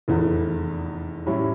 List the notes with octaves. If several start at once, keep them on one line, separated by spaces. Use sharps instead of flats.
F1 E2 E3
A2 G3 C#4 E4